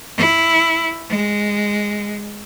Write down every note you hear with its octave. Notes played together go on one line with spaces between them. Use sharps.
E4
G#3